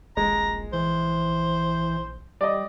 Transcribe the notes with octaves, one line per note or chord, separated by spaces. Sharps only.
D#1 A#1 G#3 A#5
E3 C5
G3 D5 D#5